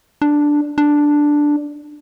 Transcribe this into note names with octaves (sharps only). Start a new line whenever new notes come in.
D4
D4